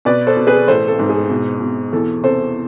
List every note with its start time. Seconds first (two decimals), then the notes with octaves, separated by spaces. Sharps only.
0.05 B2 B4 D5
0.27 A4 C5
0.37 B2
0.47 G#4 B4
0.68 A1 A4 C5
0.88 A4
0.99 G#2
1.09 G#4
1.30 B2
1.61 B2
1.93 E2 A4
2.23 C3 A4 C5